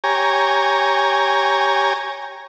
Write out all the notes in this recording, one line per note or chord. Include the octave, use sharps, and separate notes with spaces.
G4 C#5 G#5 A#5